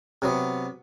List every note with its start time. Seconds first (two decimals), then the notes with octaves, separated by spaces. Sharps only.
0.22 C3 F#3 B3